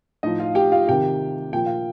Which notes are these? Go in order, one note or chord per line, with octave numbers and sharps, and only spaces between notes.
A2 F3 D#4 D#5
F4 F5
G4 G5
F4 F5
C3 D#3 G4 G5
A#2 F3 G5
F5